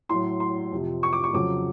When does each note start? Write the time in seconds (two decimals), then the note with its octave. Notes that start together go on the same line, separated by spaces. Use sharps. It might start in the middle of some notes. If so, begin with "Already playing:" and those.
0.09 A2 F#3 C6
0.40 C6
0.72 F2 C3 F3
1.03 C#6
1.13 D6
1.24 C#6
1.33 F2 C#3 F#3 D6